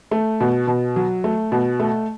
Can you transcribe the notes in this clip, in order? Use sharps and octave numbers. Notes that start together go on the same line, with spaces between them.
A3
B2
B2
F#3
A3
B2
A3